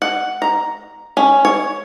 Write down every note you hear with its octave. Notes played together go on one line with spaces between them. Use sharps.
F#5
A#5
C#4
C#5